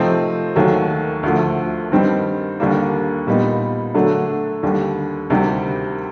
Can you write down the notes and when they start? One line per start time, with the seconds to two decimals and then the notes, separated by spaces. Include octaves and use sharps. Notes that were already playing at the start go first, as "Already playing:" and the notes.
Already playing: C3 F3 A3 C4 D#4
0.56 D#2 D#3 F#3 A3
1.23 D2 D3 F3 A3
1.92 G2 D#3 G3 C4 D#4
2.60 D#2 D3 G3 A#3 D4
3.27 A#2 G3 B3 D#4
3.95 D3 F#3 A3 D4
4.63 D#2 D3 G3
5.30 D2 C3 D#3 G3